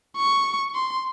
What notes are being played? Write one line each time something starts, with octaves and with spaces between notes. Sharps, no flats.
C#6
C6